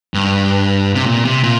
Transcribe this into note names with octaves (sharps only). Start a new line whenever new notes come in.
G2
C3
A#2
C3
A#2